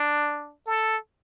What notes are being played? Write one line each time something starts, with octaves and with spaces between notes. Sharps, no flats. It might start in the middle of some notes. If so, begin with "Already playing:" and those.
Already playing: D4
A4